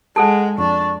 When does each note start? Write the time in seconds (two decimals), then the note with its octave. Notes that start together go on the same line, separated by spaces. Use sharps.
0.16 G#3 G#4 A4 F#5 A5
0.58 F2 D4 C#6